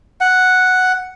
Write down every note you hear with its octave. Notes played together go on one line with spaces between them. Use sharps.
F#5